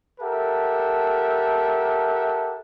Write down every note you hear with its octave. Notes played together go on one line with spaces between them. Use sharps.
G4 A4 A#4 E5 F#5 A5